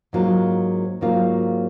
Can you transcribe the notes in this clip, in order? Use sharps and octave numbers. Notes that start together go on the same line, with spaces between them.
G#2 F#3 A#3 F4
G#2 F#3 A#3 F4